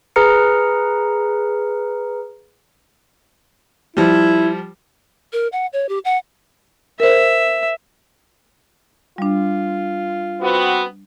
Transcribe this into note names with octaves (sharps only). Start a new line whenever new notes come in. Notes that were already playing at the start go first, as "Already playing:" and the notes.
G#4 B4 A#5 F6 C#7
F3 G3 E4
A#4
F#5
C#5
G4
F#5
A#4 C5 E5
G3 D4 F4
B3 C4 F#4